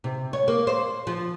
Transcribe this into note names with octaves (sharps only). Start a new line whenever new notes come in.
C3
C#5
A#3
C5
F3